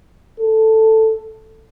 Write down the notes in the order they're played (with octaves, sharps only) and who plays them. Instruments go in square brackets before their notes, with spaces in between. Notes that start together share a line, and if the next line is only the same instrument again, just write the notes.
[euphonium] A4